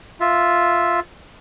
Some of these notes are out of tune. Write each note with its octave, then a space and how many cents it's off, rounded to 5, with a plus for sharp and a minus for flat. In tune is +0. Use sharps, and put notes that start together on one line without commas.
F4 +0 E5 +0